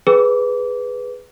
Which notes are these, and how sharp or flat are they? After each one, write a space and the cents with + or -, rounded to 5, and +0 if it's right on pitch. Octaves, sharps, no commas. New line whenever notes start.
G#4 +0 B4 +0 D6 -25